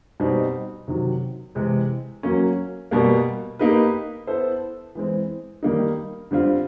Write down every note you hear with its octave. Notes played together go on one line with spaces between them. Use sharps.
B2 G3 C4 D#4
C3 D#3 F#3
C3 E3 G#3 C4
F#3 A#3 C#4
B2 G3 A#3
A#3 D#4 G4 B4
B3 E4 A4 C5
E3 G#3 C4
D#3 G3 A#3 D#4
D3 G3 C4 F4